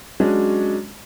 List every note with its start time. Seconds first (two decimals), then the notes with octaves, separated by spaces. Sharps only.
0.20 F#3 G#3 C#4 D4 F#4